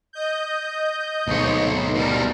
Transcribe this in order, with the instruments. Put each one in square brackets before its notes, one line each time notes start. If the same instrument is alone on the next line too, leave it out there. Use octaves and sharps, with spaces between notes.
[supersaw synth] D#5 G6
[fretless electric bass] D1 G#2 [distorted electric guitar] B1 C#5
[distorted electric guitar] B2 G3 [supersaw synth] A#4